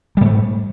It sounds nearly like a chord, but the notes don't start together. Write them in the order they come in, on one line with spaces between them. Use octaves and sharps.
G3 G#2 A3